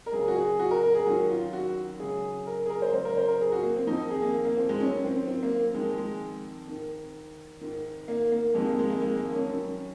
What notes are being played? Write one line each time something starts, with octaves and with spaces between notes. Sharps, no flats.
A#4
F#2 C#3 G#4
F#4
G#4
F#4
A#4
A#4
G#4
F#2 D#3 F#4
F4
F#4
F#2 C#3 G#4
A#4
G#4
A#4
C5
F#2 C#3 C5
A#4
C5
A#4
G#4
F#4
A#3
C4
F2 D#3 D#4
G#4
A#3
A#3
C4
G#3
F#2 D#3 C#4
C4
C4
A#3
F2 D#3 G#3
G#3
G#2 D#3
G#2 D#3
A#3
A#3
F2 C3 D#3 G#3
A#3
G#3
A#3
G#3
A#3
C#4
F#2 D#3